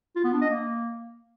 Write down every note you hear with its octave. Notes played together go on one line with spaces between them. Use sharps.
F4
B3
D4
D#5
A#3